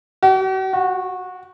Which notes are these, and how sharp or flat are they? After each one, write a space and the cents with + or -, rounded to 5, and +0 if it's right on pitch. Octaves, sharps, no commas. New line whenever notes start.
F#4 +45
F#4 -20